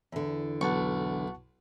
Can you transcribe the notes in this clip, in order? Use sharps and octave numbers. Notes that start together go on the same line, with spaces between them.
E2 D3
B1 F#5 A5 C#6